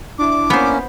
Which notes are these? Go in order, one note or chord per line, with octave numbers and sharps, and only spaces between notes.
D4 E4 D6
A#3 B3 C#4 C5